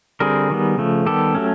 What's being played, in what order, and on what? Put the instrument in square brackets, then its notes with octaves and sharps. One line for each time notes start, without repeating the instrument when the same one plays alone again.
[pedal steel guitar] D3 G3 C4 G#4 A#4
D#3 G3 B3
C#3 F3 A3
D#3 G3 B3 G4 A4
F#3 A3 C#4